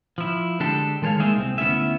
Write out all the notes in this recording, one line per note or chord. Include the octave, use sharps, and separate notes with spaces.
F3 E4
D3 G#3 D4 G4 A4
D#3 G#3 A4 C5 C#5 F5
G#3 A#3 D#4 F4 G#4 E5
C2 C4
D2 B3 C#4 E4 G#4 E5